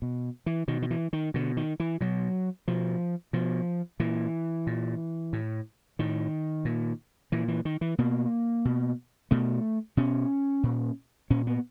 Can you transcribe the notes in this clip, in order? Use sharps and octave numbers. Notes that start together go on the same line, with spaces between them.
B2
E3
B2 D#3
D#3
E3
D#3
B2 D3
D#3
E3
B2 F#3
B2 F3
B2 F3
A#2 E3
A#2
A2
A2 D#3
A#2
A#2 E3
E3
D#3
E3
B2 A#3
B2
B2 A3
B2 C#4
A#2
A#2 C#4
B3